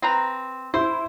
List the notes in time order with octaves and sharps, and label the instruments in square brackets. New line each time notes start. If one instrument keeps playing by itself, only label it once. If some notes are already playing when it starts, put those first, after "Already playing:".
[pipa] C4 B4 A#5
[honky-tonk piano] E4 [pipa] C5